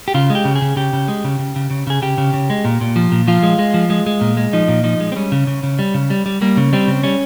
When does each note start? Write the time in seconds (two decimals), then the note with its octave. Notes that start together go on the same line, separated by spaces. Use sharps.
0.08 G4
0.14 C#3 F4
0.30 G#3
0.35 G4
0.45 C#3
0.55 G#4
0.62 C#3
0.76 C#3 G4
0.93 C#3
1.08 G#3
1.24 C#3
1.39 C#3
1.56 C#3
1.70 C#3
1.87 C#3 G#4
2.02 C#3 G4
2.18 C#3
2.34 C#3
2.50 G#3
2.65 A#2
2.81 A#2
2.96 F3
3.12 A#2
3.28 F3 F4
3.43 G#3
3.59 G#3
3.74 F3
3.90 G#3
4.07 G#3
4.21 A#2
4.37 G#3
4.53 F3 D#4
4.68 A#2
4.84 F3 D#4
5.00 G#3
5.12 C4
5.16 G3 C#4
5.32 C#3
5.47 C#3
5.63 C#3
5.79 G3
5.94 C#3
6.10 G3
6.26 G3
6.42 G3 A#3
6.57 C#3
6.73 G3 C4
6.87 C#3
7.03 G3 C#4